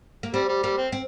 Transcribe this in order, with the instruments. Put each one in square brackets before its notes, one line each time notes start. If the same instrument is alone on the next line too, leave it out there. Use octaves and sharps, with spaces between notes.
[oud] A#3
[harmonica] G3 [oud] C4
[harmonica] G3
[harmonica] G3 [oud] A#3
[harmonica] C4
[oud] C4